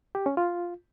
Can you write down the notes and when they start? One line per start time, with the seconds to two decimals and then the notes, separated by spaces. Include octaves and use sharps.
0.15 G4
0.26 C#4
0.37 F4